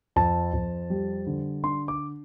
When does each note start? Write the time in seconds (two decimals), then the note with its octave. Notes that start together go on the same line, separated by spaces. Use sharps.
0.16 F2 A5
0.54 F2
0.90 G3
1.27 D3
1.64 D4 C6
1.88 D6